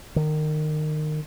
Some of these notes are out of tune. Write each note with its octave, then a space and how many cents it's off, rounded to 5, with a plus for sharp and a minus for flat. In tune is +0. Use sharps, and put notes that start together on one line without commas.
D#3 -25